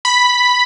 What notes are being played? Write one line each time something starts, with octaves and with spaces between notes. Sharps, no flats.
B5